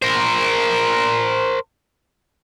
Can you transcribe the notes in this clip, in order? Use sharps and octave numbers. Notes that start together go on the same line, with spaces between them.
A#4 C5